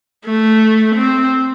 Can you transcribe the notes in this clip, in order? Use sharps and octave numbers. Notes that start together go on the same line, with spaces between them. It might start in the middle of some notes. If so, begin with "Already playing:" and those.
A3
C4